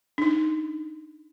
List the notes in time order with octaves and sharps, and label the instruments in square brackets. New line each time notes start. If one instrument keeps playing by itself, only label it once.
[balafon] D4 D#4